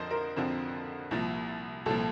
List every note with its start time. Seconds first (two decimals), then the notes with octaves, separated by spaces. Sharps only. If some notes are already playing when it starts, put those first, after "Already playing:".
Already playing: F2 D3 F3 C4 A#4 C5 D#5
0.11 A#4
0.36 F2 D3 F3 C4
1.11 C2 A#2 F3
1.86 C2 A#2 F3 A4